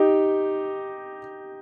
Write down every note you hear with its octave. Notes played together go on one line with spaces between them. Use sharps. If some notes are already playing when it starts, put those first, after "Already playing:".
Already playing: D#4 G4